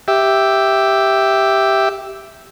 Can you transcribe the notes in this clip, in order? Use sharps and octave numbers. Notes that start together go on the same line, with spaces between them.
G4 E5